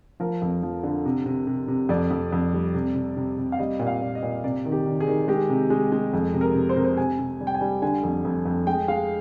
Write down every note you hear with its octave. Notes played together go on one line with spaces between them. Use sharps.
F3 A#4
F2
F3
D3
C3
C3
C3
C3
F2 D5
F2
F2
G3
C3
C3
C3
C3
F5
G3 D#5
A#2
F5
A#2
D#5
A#2
C3 D5
D#3
G4
D#3
G#4
D#3
G#3 G4
C3
G#3
G#3
F2
C3
A#4
C3
C5
C3 A#4
C5
C3 G#5
C3
G3
G5
G#5
G3
D3 G#5
F2
F2
F2
G#3 G5
G#3 F5